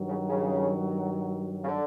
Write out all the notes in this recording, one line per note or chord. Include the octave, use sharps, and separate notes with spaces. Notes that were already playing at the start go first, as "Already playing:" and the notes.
Already playing: G2 D#3 F#3
C#3
C#3
C#3
D3